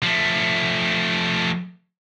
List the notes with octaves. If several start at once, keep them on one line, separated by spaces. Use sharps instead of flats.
F3 A3